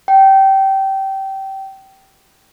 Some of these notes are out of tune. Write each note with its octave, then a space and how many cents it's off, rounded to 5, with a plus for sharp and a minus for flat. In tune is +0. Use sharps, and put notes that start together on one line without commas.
G5 -20